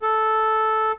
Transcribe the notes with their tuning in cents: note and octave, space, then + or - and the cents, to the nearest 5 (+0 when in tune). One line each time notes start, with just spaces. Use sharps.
A4 -5